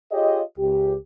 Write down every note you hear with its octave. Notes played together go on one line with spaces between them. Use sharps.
F4 G4 G#4 C#5 D#5
C#2 G4